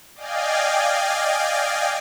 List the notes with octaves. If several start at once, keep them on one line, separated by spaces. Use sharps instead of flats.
D5 D#5 F5 G5 G#5